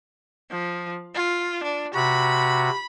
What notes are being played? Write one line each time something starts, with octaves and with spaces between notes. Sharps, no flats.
F3
F4
D4
C3 F#4 B5